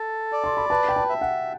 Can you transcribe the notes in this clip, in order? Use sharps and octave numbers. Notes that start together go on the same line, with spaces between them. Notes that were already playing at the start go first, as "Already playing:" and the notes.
Already playing: A4
D5
C6
B5
B4 A5
G5
A5
E5
F#5